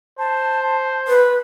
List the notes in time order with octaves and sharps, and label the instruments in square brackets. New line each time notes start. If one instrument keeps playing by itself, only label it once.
[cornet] C5 [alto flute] A5
[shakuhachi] B4